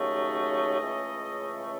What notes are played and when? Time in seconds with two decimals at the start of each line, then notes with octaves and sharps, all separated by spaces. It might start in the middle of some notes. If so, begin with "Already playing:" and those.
Already playing: D#2 C#3 F#3 A3 D#5
0.78 C#2 C#3 E3 A3